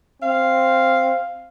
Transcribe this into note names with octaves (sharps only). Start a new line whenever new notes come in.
C4 F5